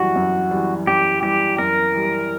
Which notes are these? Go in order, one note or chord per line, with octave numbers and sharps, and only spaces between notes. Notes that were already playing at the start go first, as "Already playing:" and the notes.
Already playing: F#2 E3 G3 F#4
F#2
E3 G3
F#2 G4
E3 G3 G4
F#2 A#4
E3 G3